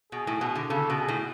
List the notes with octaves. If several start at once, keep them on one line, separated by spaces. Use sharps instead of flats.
B2 G#4
A2
B2
D3
C#3 A4
B2
G#4
A2